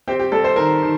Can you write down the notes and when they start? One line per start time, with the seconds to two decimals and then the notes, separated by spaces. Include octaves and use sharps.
0.08 C4 G4
0.19 G4
0.31 G3 A4
0.44 C5
0.56 D#3 A#4
0.82 D#3